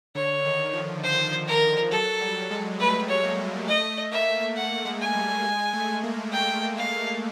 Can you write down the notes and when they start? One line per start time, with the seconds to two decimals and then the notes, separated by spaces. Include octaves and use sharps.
0.15 D3 C#5
0.45 D#3
0.73 F3
1.03 C5
1.47 A#4
1.91 F#3 A4
2.21 G3
2.51 G#3
2.79 A3 B4
3.08 C#5
3.23 A#3
3.67 A3 D#5
4.12 A#3 E5
4.56 A3 F#5
4.85 G#3
5.00 G#5
5.15 G3
5.44 G#3
5.73 A3
6.03 A#3
6.32 A3 G5
6.77 G#3 F5